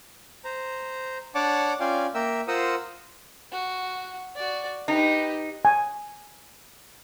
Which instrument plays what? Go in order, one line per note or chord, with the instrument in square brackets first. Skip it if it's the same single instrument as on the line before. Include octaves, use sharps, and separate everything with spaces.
[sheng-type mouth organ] C5 A#5
D4 C#5 D5 F#5 A5 D6
C#4 F4 D5 F5 G5 G#5
A#3 A#4 E5 G5 E6
F4 A#4 C5 F#5 D#6 E6
[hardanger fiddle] F#4
F#4 D5
[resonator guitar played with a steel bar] D#4 [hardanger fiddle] G4 B4
[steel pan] G#5